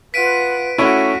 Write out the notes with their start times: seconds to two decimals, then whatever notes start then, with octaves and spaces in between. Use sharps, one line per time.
0.14 F4 B4 F#5 B6 D7 D#7
0.78 A3 C#4 E4 F#4 D#7